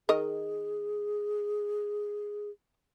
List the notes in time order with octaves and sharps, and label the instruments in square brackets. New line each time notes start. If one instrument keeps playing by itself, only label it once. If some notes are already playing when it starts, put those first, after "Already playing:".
[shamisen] D#3 A#4 D#5 [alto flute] G#4